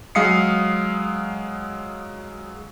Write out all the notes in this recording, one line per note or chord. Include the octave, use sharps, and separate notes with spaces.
F#3 G#3 F5 D#6 C7 C#7